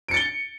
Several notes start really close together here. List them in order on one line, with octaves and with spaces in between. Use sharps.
D7 C#7 A6 G7